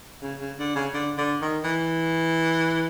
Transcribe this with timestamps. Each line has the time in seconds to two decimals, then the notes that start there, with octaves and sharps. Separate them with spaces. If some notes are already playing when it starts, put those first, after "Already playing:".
0.23 C#3
0.40 C#3
0.59 D3
0.76 C#3
0.94 D3
1.18 D3
1.41 D#3
1.64 E3